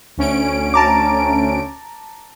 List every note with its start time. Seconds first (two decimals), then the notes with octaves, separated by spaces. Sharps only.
0.17 D2 C#4 D7
0.74 A5 A#5 D6